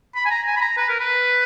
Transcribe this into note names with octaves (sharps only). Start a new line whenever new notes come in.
B5
G#5
A#5
G#5
B5
A#5
B4
A#4
B4